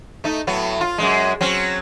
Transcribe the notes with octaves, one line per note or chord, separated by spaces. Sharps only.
A3 D#4
A2 F#3 B3
F4
F#2 C3 G#3
F#3 C4 C#4